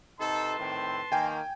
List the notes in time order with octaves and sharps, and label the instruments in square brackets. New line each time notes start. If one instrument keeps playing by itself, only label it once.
[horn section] C3 D#4 A4 [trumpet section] B4 A5 C6
[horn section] A2 D#3 C4
[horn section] D#3 A#3 [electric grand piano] G5 G#5